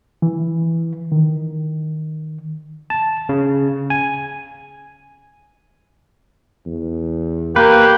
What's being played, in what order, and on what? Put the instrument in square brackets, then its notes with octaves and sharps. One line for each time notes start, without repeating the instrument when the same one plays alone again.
[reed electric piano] E3
D#3
[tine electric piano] A5
C#3
G#5
[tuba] E2
[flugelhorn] A#3 [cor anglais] G4 [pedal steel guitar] B4